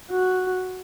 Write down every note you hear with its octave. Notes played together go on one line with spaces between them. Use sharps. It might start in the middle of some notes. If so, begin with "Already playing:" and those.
F#4